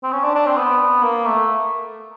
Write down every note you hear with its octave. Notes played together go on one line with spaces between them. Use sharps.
C4
C#4
D4
D4
C4
B3
A#3
A3